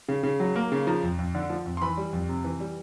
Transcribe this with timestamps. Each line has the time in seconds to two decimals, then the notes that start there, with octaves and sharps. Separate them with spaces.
0.08 C#3
0.23 C#3
0.40 F#3
0.56 A#3
0.72 C#3
0.87 F3 A#5
1.03 F2
1.19 F2
1.35 D3
1.50 F3
1.66 F2
1.77 C6
1.81 E3 B5
1.97 G3
2.13 F2
2.29 C3
2.44 E3
2.60 G3